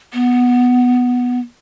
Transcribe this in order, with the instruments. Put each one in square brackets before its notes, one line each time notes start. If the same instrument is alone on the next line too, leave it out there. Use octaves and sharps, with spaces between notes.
[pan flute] B3